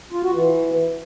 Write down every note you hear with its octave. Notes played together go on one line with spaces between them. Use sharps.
F4
F#4
E3